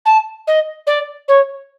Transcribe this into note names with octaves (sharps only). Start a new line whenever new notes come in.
A5
D#5
D5
C#5